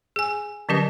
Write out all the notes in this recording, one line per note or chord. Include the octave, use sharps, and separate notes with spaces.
G#4 G#5
D3 F#3 C#4 G4 B4 D#5